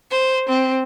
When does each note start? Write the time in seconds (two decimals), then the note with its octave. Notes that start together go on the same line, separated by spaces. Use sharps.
0.10 C5
0.48 C4